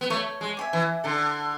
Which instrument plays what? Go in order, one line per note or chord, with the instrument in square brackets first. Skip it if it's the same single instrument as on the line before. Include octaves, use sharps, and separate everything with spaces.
[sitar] B3
[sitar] A3 [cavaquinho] C#5
[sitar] G#3
[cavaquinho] E5 G#5 D6
[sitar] E3
[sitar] D3 [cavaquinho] A4